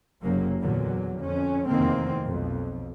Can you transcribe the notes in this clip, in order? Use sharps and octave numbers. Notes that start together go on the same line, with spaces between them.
F#1 F#2 C3 F#3 A#3
E2 A#2 D3 F#3
F2 C#4
F1 E2 D#3 A#3 C4
B1 F2